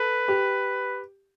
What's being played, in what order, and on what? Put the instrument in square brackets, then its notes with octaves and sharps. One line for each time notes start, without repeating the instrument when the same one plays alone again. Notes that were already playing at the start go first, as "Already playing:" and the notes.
Already playing: [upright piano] A4 [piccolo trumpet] B4
[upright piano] G4